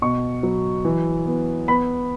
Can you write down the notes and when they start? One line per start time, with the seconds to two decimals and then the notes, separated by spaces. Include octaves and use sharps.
0.02 B2 C#6
0.43 F#3
0.85 E3
1.26 B3
1.68 B3 B5